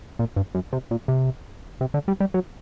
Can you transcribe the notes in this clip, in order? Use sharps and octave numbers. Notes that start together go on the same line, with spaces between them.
A#2
G2
F#2
C3
A#2
C3
C3
D3
G3
G3
F#3